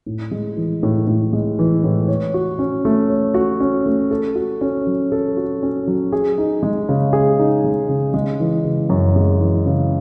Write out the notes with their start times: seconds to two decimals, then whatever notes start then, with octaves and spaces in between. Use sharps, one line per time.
0.06 A2
0.31 G#3
0.57 E3
0.83 A2
1.07 A2
1.33 G#3
1.59 E3
1.84 A2
2.08 C#5
2.34 F#4
2.59 C#4
2.85 A3
3.09 C#5
3.34 F#4
3.60 C#4
3.86 A3
4.11 A4
4.35 F#4
4.61 C#4
4.87 F#3
5.12 A4
5.37 F#4
5.63 C#4
5.87 F#3
6.12 G#4
6.38 D#4
6.63 G#3
6.89 C#3
7.13 G#4
7.39 D#4
7.64 G#3
7.89 C#3
8.14 G#3
8.40 E3
8.65 C#3
8.90 F#2
9.16 G#3
9.41 E3
9.66 C#3